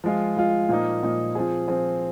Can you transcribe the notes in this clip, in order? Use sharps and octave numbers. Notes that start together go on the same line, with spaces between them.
F3 G#3 F4
F3 G#3 F4
A#2 F3 A#3 D#4
A#2 F3 A#3 D#4
F3 C4 G#4
F3 C4 G#4